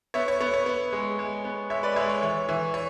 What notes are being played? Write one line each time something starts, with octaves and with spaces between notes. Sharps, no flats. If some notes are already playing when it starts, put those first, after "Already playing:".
B3 C#5 E5
C#5
B3 C#5
C#5
B3
G#3
G#3
B3
G#3 C#5 E5
B4 D5
G#3 C#5 E5
C#5
E3 C#5
E3
C#5